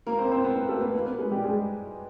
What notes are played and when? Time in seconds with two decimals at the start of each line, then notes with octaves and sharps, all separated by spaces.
0.07 A#3 A#4
0.19 C4 C5
0.32 C4 C5
0.44 B3 B4
0.56 A#3 A#4
0.69 A3 A4
0.81 B3 B4
0.93 A#3 A#4
1.06 B3 B4
1.18 G#3 G#4
1.31 G3 G4
1.43 G#3 G#4